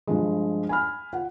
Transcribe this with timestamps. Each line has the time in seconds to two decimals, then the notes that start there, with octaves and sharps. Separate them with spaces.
0.07 G2 F3 G#3
0.69 G#5 B5 F6
1.13 F4 F#5